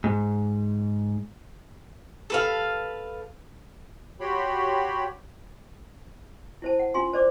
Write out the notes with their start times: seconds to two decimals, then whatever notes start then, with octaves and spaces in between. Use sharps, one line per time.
0.04 G#2
2.30 A4 B4 F5
4.20 F#4 G4 C#5 G5 B5 C6
6.62 E4 C5 A5
6.79 F#5
6.94 C#4 F4 G#5 C6
7.13 C5 D5 D6